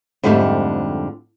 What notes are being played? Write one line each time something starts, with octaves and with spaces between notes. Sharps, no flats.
F2 G#2 D3 G3 A3